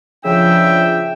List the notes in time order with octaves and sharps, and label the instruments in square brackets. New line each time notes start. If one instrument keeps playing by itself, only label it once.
[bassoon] C#3 [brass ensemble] F3 D4 G5 [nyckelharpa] E5